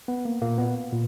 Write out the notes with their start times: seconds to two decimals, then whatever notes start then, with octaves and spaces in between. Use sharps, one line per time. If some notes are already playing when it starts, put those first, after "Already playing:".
0.08 B3
0.25 A#3
0.42 A#2 A#3
0.58 B3
0.92 A#2